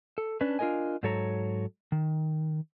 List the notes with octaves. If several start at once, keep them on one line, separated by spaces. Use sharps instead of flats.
A4
C#4 D4 B4 A5
D4 F4 G#4 A#4 D#5 G#5
G#2 F#3 A4 C#5 A#5
D#3